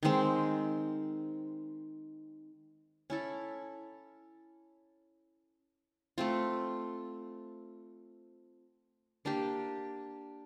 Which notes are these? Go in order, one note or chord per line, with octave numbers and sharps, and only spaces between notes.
D#3 G#3 C4
C#4 E4 A4
A3 C4 F4
A#3 D4 G4